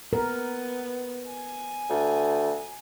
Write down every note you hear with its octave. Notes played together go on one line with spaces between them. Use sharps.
B3 A#4
G#5
D2